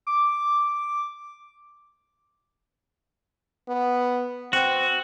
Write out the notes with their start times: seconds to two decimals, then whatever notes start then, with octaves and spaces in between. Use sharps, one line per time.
0.07 D6
3.68 B3
4.53 C4 F#4